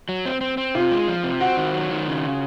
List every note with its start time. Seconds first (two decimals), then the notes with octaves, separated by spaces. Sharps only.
0.09 F#3
0.26 C4
0.41 C4
0.57 C4
0.75 C3 F4
0.92 G#3
1.08 F3
1.24 C3
1.40 C4 F#4
1.57 D#3
1.74 F#3
1.91 D#3
2.07 C#3